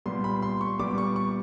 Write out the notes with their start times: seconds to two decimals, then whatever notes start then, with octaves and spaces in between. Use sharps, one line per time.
0.06 A#2 G3 B3 C6
0.24 B5
0.42 C6
0.61 C#6
0.79 A#2 G3 B3 D6
0.98 C#6
1.16 C#6